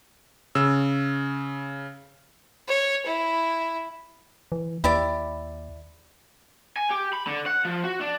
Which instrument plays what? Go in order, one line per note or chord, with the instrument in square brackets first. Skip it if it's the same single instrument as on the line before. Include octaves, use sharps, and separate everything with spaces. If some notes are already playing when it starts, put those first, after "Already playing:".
[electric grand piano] C#3 E6
[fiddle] C#5
E4
[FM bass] E3
[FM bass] D#2 [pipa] E4 G4 D5
[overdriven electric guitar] G#5
G4
B5
D3
F#5
F3
F#4
D4